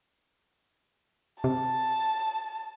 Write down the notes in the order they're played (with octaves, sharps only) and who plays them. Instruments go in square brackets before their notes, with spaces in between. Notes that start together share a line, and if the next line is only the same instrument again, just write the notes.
[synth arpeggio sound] C3 [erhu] A5